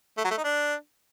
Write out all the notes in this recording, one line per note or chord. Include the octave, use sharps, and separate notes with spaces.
A3
F#3
A3
D#4
D4